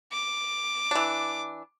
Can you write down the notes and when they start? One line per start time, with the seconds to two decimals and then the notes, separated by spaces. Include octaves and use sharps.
0.12 D6
0.91 E3 D4